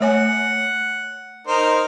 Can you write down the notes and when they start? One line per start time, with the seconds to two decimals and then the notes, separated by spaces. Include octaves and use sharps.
0.01 A3 C#5 F#5 G#5
1.47 D#4 A#4 C5